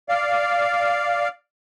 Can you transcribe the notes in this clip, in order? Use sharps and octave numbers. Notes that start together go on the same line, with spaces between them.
D5 F5